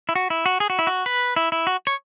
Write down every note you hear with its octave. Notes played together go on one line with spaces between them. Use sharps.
E4
F#4
E4
F#4
G#4
F#4
E4
F#4
B4
E4
E4
F#4
C#5